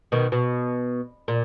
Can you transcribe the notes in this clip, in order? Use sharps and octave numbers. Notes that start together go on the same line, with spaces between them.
B2 D#3
B2
A#2